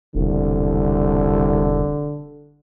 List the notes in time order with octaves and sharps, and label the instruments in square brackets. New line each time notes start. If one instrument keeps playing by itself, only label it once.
[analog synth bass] E1 [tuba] C2 [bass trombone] D3